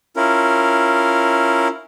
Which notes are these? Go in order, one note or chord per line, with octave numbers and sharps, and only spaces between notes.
C#4 E4 F4 A#4